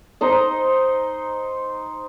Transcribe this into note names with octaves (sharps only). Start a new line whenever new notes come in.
D#4 C5 D#5